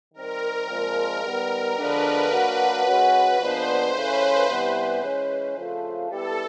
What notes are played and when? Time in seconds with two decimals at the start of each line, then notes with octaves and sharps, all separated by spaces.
0.14 D#3 G3 C4 A#4
0.68 A#2 F3 G#3 C4
1.23 D#3 G3 B3
1.76 D3 F3 G#3 B3 D4 B4
2.31 F#3 A#3 D4 F#4
2.86 G#3 C#4 F#4
3.39 A#2 F3 G#3 B3 D4 C5
3.93 C#3 E3 A3 C#4 B4
4.48 C3 E3 G3 B3
5.03 E3 G#3 C#4
5.57 C#3 F3 A3 C4 F4
6.10 G3 B3 E4 G4 A4